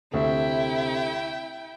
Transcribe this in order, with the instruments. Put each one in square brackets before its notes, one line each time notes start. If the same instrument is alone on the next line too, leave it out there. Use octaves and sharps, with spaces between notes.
[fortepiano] D2 [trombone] C3 [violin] E4 G5 [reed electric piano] A4 E5